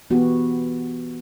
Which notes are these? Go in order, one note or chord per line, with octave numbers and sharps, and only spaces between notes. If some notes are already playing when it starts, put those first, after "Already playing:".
E3 B3 F#4 G4